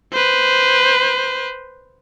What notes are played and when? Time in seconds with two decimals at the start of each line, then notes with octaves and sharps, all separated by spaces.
0.12 B4 C5